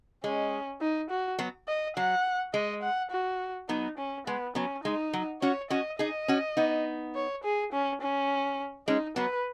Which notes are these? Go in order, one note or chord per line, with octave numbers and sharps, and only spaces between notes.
G#3 C#4
D#4
F#4
F#3 B3
D#5
F#3 F#5
G#3 D#5
F#5
F#4
F#3 B3 D#4
C#4
G#3 B3
F#3 B3 C#4
G#3 D#4
F#3
C#4 F#4 C#5
C#4 F#4 D#5
D#4 G#4 D#5
C#4 F#4
B3 D#4
C#5
G#4
C#4
C#4
G#3 C#4 D#4
F#3 B3 B4